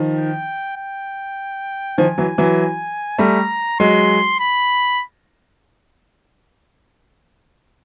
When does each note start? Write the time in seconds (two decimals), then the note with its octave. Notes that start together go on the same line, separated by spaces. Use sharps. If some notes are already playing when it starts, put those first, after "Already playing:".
Already playing: D#3 F3
0.16 G5
0.76 G5
1.98 D#3 F3 G#5
2.18 E3 F#3
2.38 E3 F#3
3.18 G3 A3 A#5
3.80 F#3 G#3 C6
4.40 B5